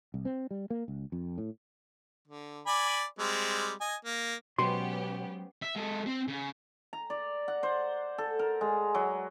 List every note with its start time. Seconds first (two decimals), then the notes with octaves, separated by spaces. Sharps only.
0.14 C2
0.25 C4
0.51 G3
0.70 A#3
0.88 C#2
1.12 F2
1.38 A2
2.28 D3
2.67 D5 G#5 B5
3.19 G3 G#3 C4
3.81 D#5 G#5
4.05 A#3
4.58 B2 F#3 G#3 B3 C#4 G4 C5 C6
5.62 E5
5.76 G#3 A4
6.06 C4
6.28 C#3
6.93 A#5
7.10 D5
7.48 F#5
7.63 C5
8.18 A4
8.39 A#4
8.61 G#3
8.95 F#3